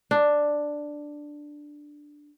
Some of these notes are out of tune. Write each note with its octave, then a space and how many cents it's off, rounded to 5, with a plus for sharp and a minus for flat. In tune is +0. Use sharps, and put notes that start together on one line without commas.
D4 +5